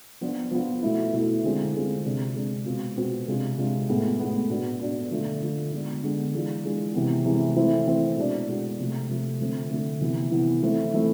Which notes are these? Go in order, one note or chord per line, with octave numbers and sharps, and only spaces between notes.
F3 B3 D4 F4
F3 B3 D4 F4
B2 A3 E4
B2 A3 E4
D3 G#3 C4 F4
D3 G#3 C4 F4
C3 G#3 D4
C3 G#3 D4
B2 G#3 C4 F4
B2 G#3 C4 F4
C3 G#3 D4 F4
C3 G#3 D4 F4
A2 G#3 B3
A2 G#3 B3
B2 B3 D4
B2 B3 D4
D3 F3 A3 D4 F4
D3 F3 A3 D4 F4
D3 G#3 B3 D4
D3 G#3 B3 D4
E3 G#3 D4 F4
E3 G#3 D4 F4
C3 E3 G#3 B3
C3 E3 G#3 B3
E3 A3 C4 E4
E3 A3 C4 E4
B2 G#3 B3 D4
B2 G#3 B3 D4
C3 F3 A3
C3 F3 A3
D3 F3 A3 C4
D3 F3 A3 C4
C3 E3 B3 E4
C3 E3 B3 E4
E3 A3 C4 E4
E3 A3 C4 E4